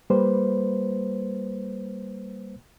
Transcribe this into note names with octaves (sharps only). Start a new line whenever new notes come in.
G3 A#3 B4 C5